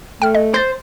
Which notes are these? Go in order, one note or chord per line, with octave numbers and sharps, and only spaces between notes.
A3 G5 F6
D#5
C5 G6 A6